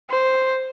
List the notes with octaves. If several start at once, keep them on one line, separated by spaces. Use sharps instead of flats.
C5